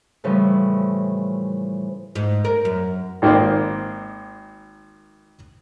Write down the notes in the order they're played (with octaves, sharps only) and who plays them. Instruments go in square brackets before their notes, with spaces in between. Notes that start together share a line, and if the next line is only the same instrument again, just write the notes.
[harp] A2 C#3 E3 F3 G3
[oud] G#2
A#4
F#2
[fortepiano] G#1 D#3 A#3 C5 D5 G5